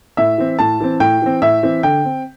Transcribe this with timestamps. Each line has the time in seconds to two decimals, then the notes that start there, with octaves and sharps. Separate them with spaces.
0.17 A2 E5
0.38 E3 C4
0.59 A2 A5
0.80 E3 C4
1.00 A2 G5
1.22 E3 C4
1.42 A2 E5
1.63 E3 C4
1.83 D3 G5
2.05 C4